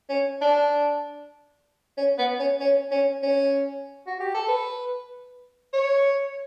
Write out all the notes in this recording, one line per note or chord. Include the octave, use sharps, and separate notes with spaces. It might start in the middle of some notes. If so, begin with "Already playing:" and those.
C#4
D4
C#4
B3
C#4
C#4
C#4
C#4
F#4
G4
A4
B4
C#5